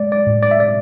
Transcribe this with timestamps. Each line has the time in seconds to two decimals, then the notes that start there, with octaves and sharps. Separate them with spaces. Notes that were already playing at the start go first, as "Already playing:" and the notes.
Already playing: G#3 D5
0.12 D5
0.27 A2
0.43 D5
0.51 E5
0.60 D5